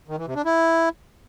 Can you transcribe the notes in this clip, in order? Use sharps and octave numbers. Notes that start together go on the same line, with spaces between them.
D#3
E3
C3
D4
E4